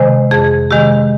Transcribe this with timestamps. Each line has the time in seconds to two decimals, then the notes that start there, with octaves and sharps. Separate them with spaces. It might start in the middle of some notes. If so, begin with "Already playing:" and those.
Already playing: C3 D#3 G#3 C5
0.31 F2 G#4
0.71 C3 D#3 G#3 G4